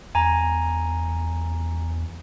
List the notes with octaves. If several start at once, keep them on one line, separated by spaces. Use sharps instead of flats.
E2 G#5 A#5